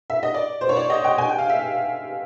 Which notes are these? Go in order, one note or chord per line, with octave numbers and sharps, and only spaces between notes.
E5
D#5
D5
C5
C#5
D5
D#5
G5
G#5
G5
F5
E5